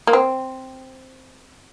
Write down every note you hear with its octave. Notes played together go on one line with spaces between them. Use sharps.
A#3
C4